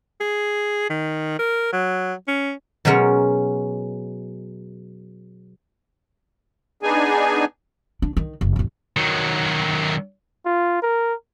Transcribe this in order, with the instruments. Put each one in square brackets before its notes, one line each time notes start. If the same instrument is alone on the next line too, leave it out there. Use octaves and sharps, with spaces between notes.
[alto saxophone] G#4
D#3
A#4
F#3
C#4
[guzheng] B2 F#3 G#3 C#4 A#4 F#5
[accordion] B3 D4 D#4 G#4 G#5
[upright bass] D4
D#3
F#1
A1 F2
[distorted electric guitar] D#3 F#3
[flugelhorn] F4
A#4